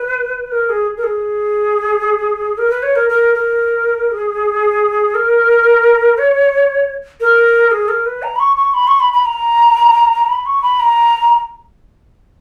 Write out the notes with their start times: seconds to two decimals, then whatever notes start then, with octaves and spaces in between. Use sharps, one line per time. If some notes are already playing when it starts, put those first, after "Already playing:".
Already playing: B4
0.51 A#4
0.69 G#4
0.97 A#4
1.03 G#4
2.58 A#4
2.70 B4
2.83 C#5
2.96 A#4
3.09 A#4
3.35 A#4
4.12 G#4
5.15 A#4
6.18 C#5
7.21 A#4
7.71 G#4
7.89 A#4
8.06 B4
8.23 A#5
8.36 B5
8.40 C#6
8.57 C#6
8.74 B5
8.88 C#6
9.00 B5
9.13 B5
9.25 A#5
10.28 B5
10.46 C#6
10.62 B5
10.80 A#5